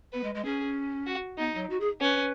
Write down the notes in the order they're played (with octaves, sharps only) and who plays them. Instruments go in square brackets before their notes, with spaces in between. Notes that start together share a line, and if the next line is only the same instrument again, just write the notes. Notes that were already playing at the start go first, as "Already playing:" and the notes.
[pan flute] B3 [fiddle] B4
[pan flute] G#3
G#3
[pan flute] C#4 [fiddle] G#4
[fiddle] F#4
[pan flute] B3 [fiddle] D#4
[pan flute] F#3
F#4
G#4
[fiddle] C#4 [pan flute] B4